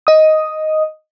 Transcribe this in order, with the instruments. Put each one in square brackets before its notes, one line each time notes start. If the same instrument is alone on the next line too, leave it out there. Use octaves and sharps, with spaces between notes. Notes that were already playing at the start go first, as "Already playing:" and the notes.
[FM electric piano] D#5 D#6